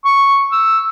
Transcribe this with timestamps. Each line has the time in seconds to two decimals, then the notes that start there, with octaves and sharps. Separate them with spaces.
0.05 C#6
0.52 E6